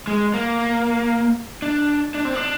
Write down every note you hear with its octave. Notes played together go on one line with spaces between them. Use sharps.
G#3
A#3
D4
D4
C4
D4